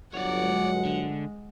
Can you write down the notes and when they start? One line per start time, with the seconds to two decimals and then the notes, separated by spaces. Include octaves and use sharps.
0.14 G1 F#3 C#5 D5 F#5
0.44 G#3
0.85 D3